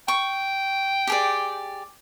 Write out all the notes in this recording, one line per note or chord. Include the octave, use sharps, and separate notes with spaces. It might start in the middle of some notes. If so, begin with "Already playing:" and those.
G5 C#6
G4 G#4 D5